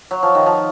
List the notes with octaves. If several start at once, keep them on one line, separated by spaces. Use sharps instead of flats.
F#3
F3
D#3
F3